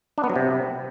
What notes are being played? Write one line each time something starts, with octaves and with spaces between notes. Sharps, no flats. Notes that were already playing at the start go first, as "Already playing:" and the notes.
D4
B3
F#3
C3